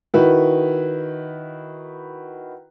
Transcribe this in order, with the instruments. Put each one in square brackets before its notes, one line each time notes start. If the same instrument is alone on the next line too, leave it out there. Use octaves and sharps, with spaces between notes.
[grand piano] D#3 E4 F#4 B4